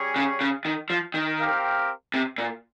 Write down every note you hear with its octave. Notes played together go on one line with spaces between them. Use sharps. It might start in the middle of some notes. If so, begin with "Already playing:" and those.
Already playing: G3 C#4 G#4 C#5
C#3
C#3
D#3
F3
D#3
C4 G4 A#4 F5
C3
A#2